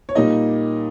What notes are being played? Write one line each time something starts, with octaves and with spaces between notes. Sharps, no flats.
C#5
A#2 G3 A#3 D#4 D#5